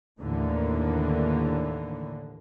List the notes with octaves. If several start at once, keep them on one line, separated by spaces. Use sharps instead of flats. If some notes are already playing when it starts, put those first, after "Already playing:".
D#2 A2 D3 E3 A#3